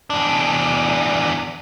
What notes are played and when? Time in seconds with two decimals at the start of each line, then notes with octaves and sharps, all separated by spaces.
0.10 E2 D4